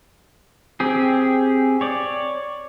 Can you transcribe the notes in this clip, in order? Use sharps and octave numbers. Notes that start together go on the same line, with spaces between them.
C4 G4 G#4
C#5 D5